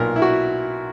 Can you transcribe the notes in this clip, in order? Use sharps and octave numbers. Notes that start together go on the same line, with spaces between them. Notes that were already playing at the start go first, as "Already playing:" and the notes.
Already playing: B1 A#2 A#4
E4
F#4